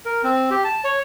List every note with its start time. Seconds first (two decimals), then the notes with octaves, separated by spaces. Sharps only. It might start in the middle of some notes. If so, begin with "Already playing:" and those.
0.05 A#4
0.24 C4
0.51 G4
0.64 A5
0.84 C#5